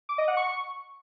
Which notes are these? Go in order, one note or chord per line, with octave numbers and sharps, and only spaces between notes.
D6
D#5
F#5
C#6